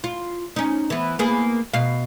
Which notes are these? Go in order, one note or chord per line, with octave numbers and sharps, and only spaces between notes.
F4
C#4 D#4
E3 B3
A#3 B3 G#4
B2 F5